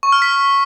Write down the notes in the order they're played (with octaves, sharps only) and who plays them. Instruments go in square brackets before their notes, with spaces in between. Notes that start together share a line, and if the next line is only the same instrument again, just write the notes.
[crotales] C#6
F6
B6